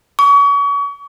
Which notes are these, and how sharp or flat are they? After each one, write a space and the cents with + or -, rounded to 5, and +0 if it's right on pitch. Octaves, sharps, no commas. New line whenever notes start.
C#6 +35